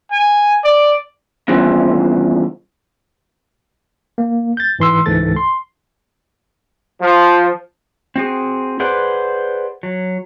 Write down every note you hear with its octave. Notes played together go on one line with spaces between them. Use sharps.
G#5
D5
E2 G2 C#3 F3
A#3
G6 A6
G#2 E3 C6 E6
C#2 G#2 E3 A4 A6
C6
F3
C4 F#4 G#4
G#4 B4 C5 D5 F#5
F#3